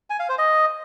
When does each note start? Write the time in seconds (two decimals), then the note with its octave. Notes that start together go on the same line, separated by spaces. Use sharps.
0.10 G#5
0.19 F5
0.29 C5
0.38 D#5